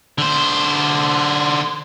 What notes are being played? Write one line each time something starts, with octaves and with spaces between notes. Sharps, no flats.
D3 C5